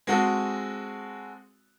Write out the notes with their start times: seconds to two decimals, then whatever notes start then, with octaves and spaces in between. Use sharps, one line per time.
0.07 G#3 C4 F#4 G#4 A4